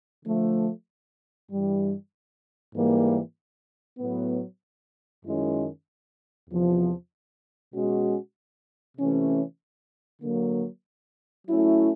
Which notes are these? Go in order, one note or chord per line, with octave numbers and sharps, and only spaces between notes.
D3 F3 A3
G2 E3 G3
G#2 E3 G3 A#3
A2 F#3 B3
F#2 D#3 G#3 C#4 E4
E2 C3 F3
B2 G#3 C#4 F#4
C3 E3 A3 C#4
D3 F#3 A#3
F#3 A3 C#4 E4